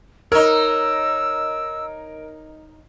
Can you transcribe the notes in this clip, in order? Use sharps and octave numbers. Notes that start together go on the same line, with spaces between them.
D#4 A#4 C#5 E6